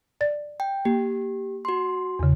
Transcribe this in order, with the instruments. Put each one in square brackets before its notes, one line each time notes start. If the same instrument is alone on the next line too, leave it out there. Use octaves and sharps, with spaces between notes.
[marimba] D5 A6
[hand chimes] G5
[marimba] A#3 [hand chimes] G4
[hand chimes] F#4 C6
[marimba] E2 C#3